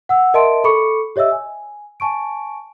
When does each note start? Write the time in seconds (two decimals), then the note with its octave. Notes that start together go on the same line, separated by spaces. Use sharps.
0.09 F#5 E6
0.34 A#4 D#5 E5 A5 C6 D7
0.64 A4 B5 C#6 D6 C#7
1.16 G4 C#5 D#5 E5 E6
1.32 G#5
2.00 G#5 A5 C#6 D7